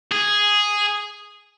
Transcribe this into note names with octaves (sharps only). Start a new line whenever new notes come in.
G#4